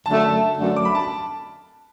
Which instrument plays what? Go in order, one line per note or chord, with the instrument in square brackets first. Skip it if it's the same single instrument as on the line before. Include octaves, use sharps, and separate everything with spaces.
[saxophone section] F#2 D3 A3 [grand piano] A5
[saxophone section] F#2 D3 A3
[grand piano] D6
B5
A5